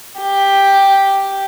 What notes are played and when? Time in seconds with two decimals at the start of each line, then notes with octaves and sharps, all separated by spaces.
0.20 G4